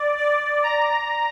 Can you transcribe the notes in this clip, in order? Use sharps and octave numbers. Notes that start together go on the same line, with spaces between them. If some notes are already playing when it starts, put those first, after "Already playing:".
Already playing: D5
D5
A#5